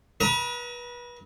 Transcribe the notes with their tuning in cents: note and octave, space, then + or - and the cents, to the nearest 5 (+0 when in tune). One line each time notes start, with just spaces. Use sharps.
B4 -30 A#5 +0 D#6 +45